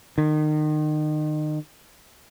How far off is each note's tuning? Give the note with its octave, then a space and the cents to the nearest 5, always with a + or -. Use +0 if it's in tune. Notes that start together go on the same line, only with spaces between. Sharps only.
D#3 -30